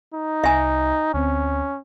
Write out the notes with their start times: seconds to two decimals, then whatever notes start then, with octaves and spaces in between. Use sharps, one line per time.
0.14 D#4
0.44 C2 E5 G#5
1.14 D2 C4 C#4